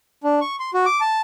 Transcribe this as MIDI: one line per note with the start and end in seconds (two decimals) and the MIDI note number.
0.24 0.40 62
0.41 0.56 85
0.59 0.70 84
0.74 0.86 66
0.86 1.00 86
1.01 1.21 81